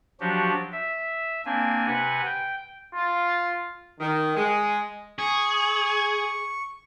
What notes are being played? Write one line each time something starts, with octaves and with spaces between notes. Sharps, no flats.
F3 F#3 D4 F#4 G4
E5
A#3 C4 D4 G#5
C3 B4 F#5 G#5
G5
F4
D#3
G#3
G#4 C#6